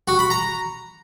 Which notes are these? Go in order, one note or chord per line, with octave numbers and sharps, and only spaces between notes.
F#4
B5
A#5